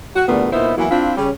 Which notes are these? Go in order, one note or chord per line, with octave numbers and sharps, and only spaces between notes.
F#4
E2 A#2 D3 G3 A3 B3
A#2 B3 D#4 E4 C5 E5
E3 F#3 A#3 B3 E4
C4 D4 E4 F4
C#3 G3 C#4 G4